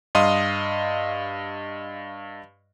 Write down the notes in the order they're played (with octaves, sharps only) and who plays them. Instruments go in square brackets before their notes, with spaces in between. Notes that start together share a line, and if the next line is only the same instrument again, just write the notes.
[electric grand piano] G2 D#5 F5 C6 D#6